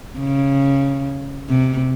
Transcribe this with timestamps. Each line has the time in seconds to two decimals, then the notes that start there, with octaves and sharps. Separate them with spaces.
0.20 C#3
1.50 C3